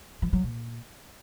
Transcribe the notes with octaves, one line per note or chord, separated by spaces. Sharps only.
F3
F#3
A#2